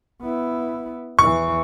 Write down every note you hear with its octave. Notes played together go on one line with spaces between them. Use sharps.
B3 E4
E2 E3 C#6